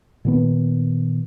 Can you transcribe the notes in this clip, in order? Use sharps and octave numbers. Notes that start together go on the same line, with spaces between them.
A#2 D#3 B3